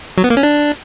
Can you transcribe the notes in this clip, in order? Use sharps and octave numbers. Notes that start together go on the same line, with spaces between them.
F#3
B3
A#3
C#4
D4